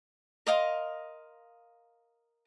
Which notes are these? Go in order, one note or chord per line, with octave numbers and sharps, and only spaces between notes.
A#4 D#5 F5 C6